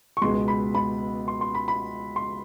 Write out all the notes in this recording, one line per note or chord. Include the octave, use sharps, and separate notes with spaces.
C#6
C#2 B2 G#3 B3 C6
B5
B5
C6
C6
B5
B5
C6